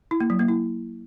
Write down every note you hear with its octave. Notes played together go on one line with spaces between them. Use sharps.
E4
A#3
F#3
A#3
E4